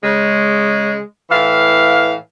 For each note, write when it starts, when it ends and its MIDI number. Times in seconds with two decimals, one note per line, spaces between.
0.04 0.97 49
0.04 0.97 56
1.31 2.14 45
1.31 2.14 52
1.31 2.14 77